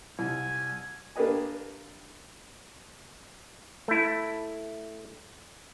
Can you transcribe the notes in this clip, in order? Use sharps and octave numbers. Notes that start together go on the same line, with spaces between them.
C2 G#5
A#3 D4 G4 B4 D#5 G#5
A3 E4